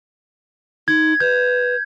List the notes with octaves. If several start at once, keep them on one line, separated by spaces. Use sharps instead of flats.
D#4 G#6
B4 G6